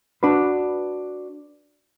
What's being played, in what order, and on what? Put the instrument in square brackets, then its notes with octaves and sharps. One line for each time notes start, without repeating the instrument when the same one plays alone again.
[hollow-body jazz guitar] D4 F#4 B4